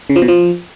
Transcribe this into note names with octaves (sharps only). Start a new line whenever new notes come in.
C#3
F3
B2
F3